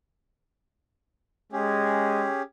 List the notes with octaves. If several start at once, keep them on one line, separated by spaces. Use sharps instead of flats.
G#3 C#4 G4 G#4